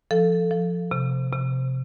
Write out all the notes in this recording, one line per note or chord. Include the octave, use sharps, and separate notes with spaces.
F3 A4
F3
C3
C3